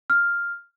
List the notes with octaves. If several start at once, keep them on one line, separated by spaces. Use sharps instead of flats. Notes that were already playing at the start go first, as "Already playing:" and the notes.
F6